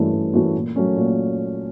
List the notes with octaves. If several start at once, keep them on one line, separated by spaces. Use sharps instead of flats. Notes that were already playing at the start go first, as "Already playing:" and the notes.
Already playing: G2 E3 A3 C#4 F#4
G2
E3 A3 C#4 F#4
A#2
F#3 A3 C#4
A#2